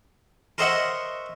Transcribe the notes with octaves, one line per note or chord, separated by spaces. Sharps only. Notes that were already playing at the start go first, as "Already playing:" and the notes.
A#4 C5 C#5 D#5 E5 F#5